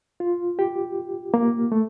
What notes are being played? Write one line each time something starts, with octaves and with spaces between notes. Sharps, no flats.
F4
G4
A#3
A3